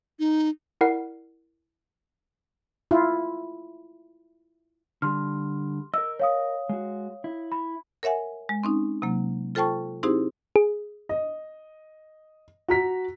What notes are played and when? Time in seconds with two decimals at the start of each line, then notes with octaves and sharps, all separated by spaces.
0.19 D#4
0.81 E4 A#4 D5 F#5 C7
2.91 E4 F4
5.02 D3 G3 C6 F6
5.94 A#4 D#5 E6
6.19 C#5 F5 D#6
6.69 G#3 F#4
7.24 E4
7.52 B5
8.03 A#4 C#5 E5 F#5 G#5
8.49 G#3
8.64 C4 C#4 D#4
9.02 C3 F#3 A#3
9.55 F4 A4 C5 G5 A5 C#6
10.03 C4 D#4 E4 G4 G#4 C5
10.56 G#4
11.09 D#5
12.68 F#4 A#5 B6